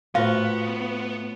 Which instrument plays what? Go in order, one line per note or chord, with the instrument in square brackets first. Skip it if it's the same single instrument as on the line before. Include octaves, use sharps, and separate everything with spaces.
[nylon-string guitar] A2 C5 [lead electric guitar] B3 B4 [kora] F4 F#4 [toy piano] F5